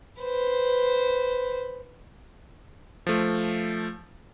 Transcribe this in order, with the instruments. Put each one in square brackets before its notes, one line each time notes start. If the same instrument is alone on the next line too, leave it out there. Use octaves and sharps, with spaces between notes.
[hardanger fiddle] B4 C5
[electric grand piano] F3 A3